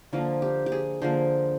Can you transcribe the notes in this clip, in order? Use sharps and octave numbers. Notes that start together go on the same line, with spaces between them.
D3 F3 A#3 F4
G4
G4
G#4
D3 F3 A#3 C5